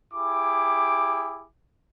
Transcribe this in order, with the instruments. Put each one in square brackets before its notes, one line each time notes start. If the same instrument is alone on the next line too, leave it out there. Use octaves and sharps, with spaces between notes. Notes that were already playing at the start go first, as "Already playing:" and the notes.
[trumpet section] E4 G4 G#4 D6